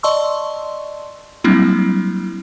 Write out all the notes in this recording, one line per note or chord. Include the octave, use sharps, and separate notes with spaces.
D5 D#5 A5 C6 C#6 E6
F#3 G3 A#3 C4 D4 E4